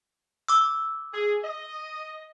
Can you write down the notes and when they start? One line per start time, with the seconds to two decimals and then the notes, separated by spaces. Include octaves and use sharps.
0.48 D6 E6
1.14 G#4
1.44 D#5